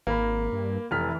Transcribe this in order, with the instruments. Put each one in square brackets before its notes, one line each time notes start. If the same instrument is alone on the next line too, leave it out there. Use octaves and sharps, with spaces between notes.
[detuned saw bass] G#1 [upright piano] A#3 A#4 B5
[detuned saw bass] G2
[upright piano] F1 F6 B6 [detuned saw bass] E3